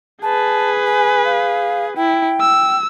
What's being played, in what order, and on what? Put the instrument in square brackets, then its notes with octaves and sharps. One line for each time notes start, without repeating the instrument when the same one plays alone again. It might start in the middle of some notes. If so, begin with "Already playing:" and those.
[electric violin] G#4 B4 [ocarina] A5
[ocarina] G#5
F5
[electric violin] E4 [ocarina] G5
[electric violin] E6